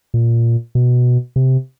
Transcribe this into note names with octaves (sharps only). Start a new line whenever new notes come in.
A#2
B2
C3